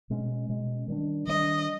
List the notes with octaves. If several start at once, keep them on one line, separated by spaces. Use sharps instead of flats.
B2 G#3 C#4
B2 G#3 C#4
D#3 G3 A#3 D4
D#3 G3 A#3 D4 D#5